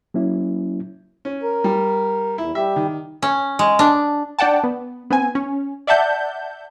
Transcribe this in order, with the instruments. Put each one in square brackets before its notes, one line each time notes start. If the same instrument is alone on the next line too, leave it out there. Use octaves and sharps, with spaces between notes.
[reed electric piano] F#3 A#3 C#4 E4
[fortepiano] C#4
[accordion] A#4
[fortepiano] G3
[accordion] E2 [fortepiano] E4
[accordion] G3 G4 [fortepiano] E5
[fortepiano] D#3
[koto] C#4
G#3
D4
[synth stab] D4 D5 F#5 G5 A5
B3
B3 C4 G#5
C#4
D5 E5 F#5 A5 G6